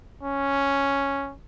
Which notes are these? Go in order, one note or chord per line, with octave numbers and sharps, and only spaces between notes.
C#4